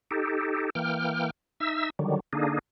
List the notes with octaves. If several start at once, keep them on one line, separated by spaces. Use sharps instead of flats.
D#4 G4 A4
E3 A#3 G5 F6
D#4 E5 E6
D3 D#3 F#3 G3
D3 A#3 D4 D#4 G#4